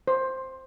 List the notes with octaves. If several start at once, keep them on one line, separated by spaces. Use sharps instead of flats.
C5